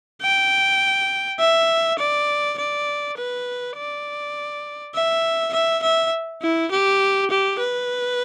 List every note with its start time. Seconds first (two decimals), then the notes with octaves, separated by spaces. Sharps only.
0.22 G5
1.40 E5
1.99 D5
2.58 D5
3.18 B4
3.76 D5
4.95 E5
5.53 E5
5.83 E5
6.42 E4
6.71 G4
7.31 G4
7.60 B4